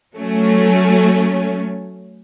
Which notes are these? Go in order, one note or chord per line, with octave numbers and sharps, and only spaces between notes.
F#3 A3 C#4